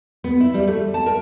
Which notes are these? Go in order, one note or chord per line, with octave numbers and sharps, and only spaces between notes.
B3
E4
G3
A3
A5
A#4